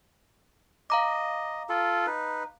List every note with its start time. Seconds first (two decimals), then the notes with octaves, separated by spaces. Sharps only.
0.90 D#5 F5 A#5 D6
1.69 F4 A4
2.06 D#4 B4